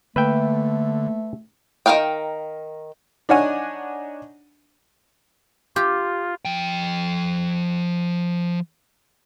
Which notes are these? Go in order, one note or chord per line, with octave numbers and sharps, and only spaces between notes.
D3 A3 A#3 B4 E5 G5
D#3 F4 A#4 F5 G5
D4 D#4 C#5 F#5 G#5
F4 G4
F3 G5